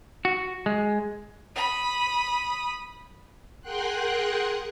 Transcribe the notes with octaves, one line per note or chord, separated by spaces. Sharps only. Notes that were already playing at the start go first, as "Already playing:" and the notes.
F#4
G#3
B5 D#6
G#4 A#4 F#5 G5 C6 F#6